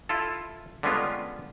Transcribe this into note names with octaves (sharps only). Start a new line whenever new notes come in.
E4 F4 A4
D3 G3 G#3 B3 C#4 F4